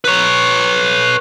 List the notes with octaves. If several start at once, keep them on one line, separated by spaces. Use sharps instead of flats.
B4 C#5